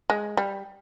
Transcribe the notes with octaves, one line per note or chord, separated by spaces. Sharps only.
G#3
G3